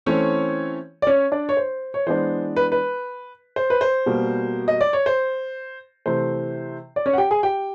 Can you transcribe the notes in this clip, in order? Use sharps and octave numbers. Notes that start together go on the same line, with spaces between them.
E3 A3 C4 C#4 C#5
D5
C#4 C#5
D4 D5
C#5
C5
C#5
E3 G#3 B3 D4 C5
B4
B4
C5
B4
C5
B2 G3 A#3
D#5
D5
C#5
C5
C3 E3 A3 C5
D5
C#4 C#5
F#5
G4 G5
G#4 G#5
G4 G5